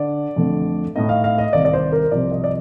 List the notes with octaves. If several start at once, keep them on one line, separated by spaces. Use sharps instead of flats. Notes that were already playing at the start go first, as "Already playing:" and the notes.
Already playing: D3 D5
F2 D3 A3
A2 A3 D#4 D#5
F5
F5
D#5
C2 C3 D#3 D5
D5
C5
A#4
C2 C3 F3 D5
D#5
D5